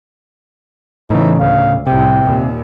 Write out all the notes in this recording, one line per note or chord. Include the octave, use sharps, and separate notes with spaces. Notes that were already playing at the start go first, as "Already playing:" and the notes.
A2 C#3 E3 D#4
D2 F5
C2 A2 C3 G5
D#2 A#2